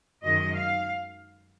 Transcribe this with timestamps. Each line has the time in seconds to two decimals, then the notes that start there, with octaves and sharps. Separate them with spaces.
0.23 F#2 D#3 G#3 D#5
0.54 F5